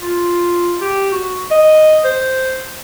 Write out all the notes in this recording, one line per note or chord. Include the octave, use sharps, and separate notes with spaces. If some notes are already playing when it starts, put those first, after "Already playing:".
F4
G4
F#4
D#5
C5